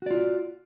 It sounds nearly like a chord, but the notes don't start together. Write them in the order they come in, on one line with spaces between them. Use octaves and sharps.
F#4 D5 F4